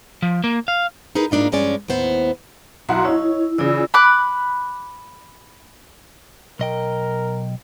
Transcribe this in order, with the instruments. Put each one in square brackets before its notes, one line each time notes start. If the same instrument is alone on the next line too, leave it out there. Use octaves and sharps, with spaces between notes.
[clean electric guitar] F3
A#3
F5
[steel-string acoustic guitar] D#4 G#4 A#4 B4
G#2 A#3 D4 D#4 F4
G2 F3 G#3 C#4 D5 G#5
D#2 A2 B3 C5
[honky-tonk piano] B1 E4 F#5 [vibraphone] F#4 A#5 C6
[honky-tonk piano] D#4 C#5 [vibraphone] E4
[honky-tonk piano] C#3 E3 [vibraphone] F4 D5 E6
[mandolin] B5 D6 F#6
[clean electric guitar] B1 D#5 G5 [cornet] A#4